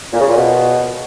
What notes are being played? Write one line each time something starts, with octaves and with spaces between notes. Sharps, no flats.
A#2
C#3
A#2
B2